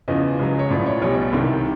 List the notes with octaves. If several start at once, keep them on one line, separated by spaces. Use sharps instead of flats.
E2 C#3 F3 D#5
C#2 C#3 F#3
C#5
A1 A2 F3 D5
C#5
B1 B2 G3 C#5
C2 C3 D#3